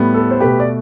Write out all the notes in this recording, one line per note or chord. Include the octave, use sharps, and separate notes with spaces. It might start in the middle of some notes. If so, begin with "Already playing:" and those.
Already playing: A2 G3 B3
A4
C5
B2 A3 G4 B4
D5